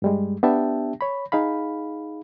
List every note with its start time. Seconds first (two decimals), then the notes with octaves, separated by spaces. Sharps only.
0.02 G2 G3 G#3
0.43 B3 D4 G4 E5 G5 A5
1.01 C#5 B5
1.32 D#4 G#4 F5 B5